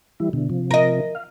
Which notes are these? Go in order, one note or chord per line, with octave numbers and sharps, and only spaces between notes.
E3 G3 E4
B2 D3
C3 F3
A#4 D#5
F5